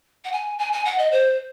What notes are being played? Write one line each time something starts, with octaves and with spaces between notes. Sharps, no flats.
F#5
G#5
G#5
G#5
F#5
D#5
C5